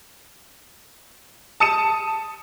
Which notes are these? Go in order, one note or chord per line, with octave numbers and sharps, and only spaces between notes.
A5 D#6 C#7 D#7 E7